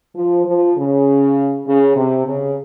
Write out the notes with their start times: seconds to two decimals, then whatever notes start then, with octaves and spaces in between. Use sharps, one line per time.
0.15 F3
0.46 F3
0.76 C#3
1.67 C#3
1.96 C3
2.26 C#3